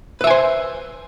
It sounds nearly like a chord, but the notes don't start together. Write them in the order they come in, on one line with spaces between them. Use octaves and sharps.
B4 E5 G#5 C5